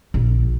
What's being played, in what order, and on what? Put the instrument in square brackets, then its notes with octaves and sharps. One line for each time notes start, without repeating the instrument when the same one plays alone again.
[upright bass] A#1